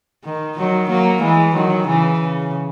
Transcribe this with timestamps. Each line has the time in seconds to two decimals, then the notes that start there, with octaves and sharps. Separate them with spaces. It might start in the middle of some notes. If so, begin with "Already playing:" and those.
0.25 D#3
0.57 D#3 F#3
0.90 F#3 A#3
1.21 E3 G#3
1.54 D#3 F#3
1.87 C#3 E3
2.19 C#3